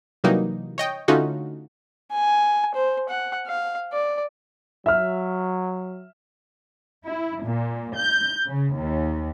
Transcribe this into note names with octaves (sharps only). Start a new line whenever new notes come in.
C3 E3 F#3 G3 A#3 D#4
C#5 D#5 G5
D3 A3 C#4 D#4 F4 F#4
G#5
C5
F#5
F5
D5
F#3 E5 F6
E4
A#2
G6
C#3
D#2